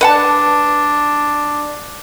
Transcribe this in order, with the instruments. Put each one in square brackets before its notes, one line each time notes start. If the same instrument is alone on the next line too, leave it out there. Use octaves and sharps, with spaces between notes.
[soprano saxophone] D4 [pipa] B4 F#5 A5